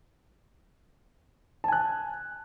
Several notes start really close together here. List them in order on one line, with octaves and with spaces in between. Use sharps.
A5 G#5 F#6